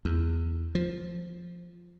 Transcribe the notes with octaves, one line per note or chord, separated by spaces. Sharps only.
E2
F3